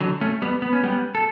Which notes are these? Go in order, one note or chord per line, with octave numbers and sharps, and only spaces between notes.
D3 F#3
A3 C#4
G3 B3
B3
C#4
G3 B3
A4